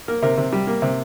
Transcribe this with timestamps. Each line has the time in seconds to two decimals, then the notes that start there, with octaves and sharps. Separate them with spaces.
0.08 A#3 A#4
0.22 C3 A#4
0.37 C3
0.52 G3
0.67 A#3
0.82 C3